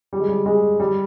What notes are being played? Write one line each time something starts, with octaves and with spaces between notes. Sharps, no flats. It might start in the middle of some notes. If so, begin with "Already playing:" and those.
G3
G#3
G3
G#3
G3